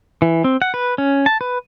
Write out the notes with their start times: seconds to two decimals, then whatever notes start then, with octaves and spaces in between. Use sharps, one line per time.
0.22 E3
0.44 C4
0.62 F#5
0.74 B4
0.98 C#4
1.26 A5
1.41 B4